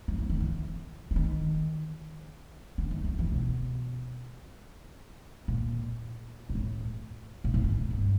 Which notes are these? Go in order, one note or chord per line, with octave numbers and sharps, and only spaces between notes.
F3
E3
D#3
E3
E3
D#3
D3
D#3
D3
E3
B2
A#2
A#2
A2
A#2
A2
G#2
G2